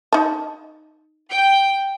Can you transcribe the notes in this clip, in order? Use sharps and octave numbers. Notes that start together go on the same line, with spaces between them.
D#4 A5
G5